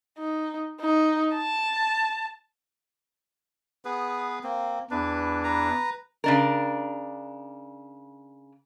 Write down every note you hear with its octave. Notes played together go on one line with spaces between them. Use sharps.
D#4
D#4
A5
B3 G#4 B4
A#3 C4
E2 D4 B4
B4 A#5
C#3 D4 A#4